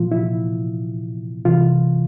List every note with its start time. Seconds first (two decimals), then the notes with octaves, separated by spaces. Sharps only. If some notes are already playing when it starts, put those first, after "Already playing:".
Already playing: A#2 F3 F4
0.12 E4
1.45 C3 E3 F4